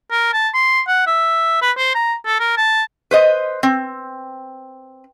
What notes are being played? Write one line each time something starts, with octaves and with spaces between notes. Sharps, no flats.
A#4
A5
C6
F#5
E5
B4
C5
A#5
A4
A#4
A5
B4 C5 D#5
C4